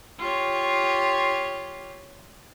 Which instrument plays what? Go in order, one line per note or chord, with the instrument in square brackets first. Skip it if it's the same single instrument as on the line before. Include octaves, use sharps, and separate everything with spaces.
[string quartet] F4 G4 C#5